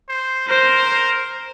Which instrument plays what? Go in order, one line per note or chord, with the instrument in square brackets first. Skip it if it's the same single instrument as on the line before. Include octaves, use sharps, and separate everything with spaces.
[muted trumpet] C5
[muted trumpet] A#4 [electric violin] C5